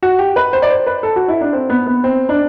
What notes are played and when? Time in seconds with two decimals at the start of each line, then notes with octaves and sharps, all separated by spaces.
0.03 F#4
0.19 G4
0.36 B4
0.53 C5
0.62 D5
0.70 C5
0.86 B4
1.03 A4
1.16 F#4
1.28 E4
1.41 D4
1.53 C4
1.70 B3
1.87 B3
2.04 C4
2.29 D4